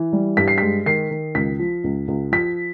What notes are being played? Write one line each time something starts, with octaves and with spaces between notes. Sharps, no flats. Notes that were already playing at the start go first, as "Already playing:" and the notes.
Already playing: E3
G3
G2 B6
C7
B6
G#3
D#3 C7
D#3
C#2 B6
F3
C#2
C#2
F3 B6